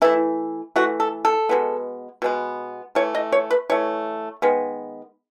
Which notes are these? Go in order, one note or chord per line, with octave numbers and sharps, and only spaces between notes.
E3 A3 E4
E3 A3 F#4
A4
A4
B2 G#3 B3
B2 G#3 B3
E3 A3 C#5
D#5
C#5
B4
E3 A3 C#5
D#3 G#3 B3